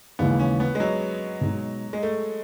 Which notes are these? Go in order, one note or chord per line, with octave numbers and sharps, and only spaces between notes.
D#2 C#3 E3 G#3 B3
C#4
B3
G#3
F#3
B2 G#3 D#4
G#3
A3